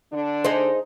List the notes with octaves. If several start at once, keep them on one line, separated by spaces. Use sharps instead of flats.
D3 D4
D#4 G#4 C5